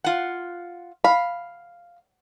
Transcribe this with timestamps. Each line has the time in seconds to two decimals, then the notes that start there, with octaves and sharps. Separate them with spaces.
0.04 F4 F#5
1.04 F5 B5